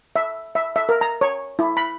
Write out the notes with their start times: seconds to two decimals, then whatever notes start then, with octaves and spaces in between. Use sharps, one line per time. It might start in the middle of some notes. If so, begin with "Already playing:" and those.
0.16 E5
0.55 E5
0.76 E5
0.89 A#4
1.01 A#5
1.21 C#5
1.59 E4
1.77 B5